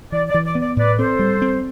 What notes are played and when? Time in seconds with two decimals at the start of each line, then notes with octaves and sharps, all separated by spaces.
0.12 E3 D5
0.29 D5
0.34 E3
0.46 D5
0.55 B3
0.61 D5
0.76 A2 B4 D5
0.98 C4 A4 C5
1.19 G3
1.42 C4